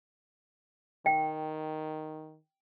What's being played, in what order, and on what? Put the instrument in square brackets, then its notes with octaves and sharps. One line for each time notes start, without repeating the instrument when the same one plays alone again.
[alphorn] D#3 [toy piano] G5